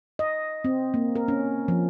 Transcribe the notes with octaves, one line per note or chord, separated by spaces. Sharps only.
D#5
C4
A#3
A#4
C#4
F3